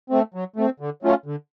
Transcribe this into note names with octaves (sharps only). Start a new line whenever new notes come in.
A3 C4
F#3
A3 C4
D3
F#3 A3 C#4 F4
D3